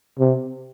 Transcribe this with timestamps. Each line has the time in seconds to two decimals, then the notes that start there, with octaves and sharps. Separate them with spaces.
0.19 C3